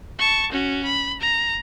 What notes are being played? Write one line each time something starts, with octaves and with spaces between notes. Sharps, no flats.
A5 C#6
C#4 F#4
B5
A#5